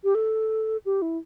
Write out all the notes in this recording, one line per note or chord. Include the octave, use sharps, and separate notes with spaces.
G4
A4
G4
E4